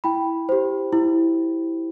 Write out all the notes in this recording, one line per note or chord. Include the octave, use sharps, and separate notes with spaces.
E4 G5 B5
G4 C5
E4